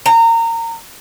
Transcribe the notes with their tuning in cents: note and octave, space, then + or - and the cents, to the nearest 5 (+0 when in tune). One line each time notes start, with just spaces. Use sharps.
A#5 -25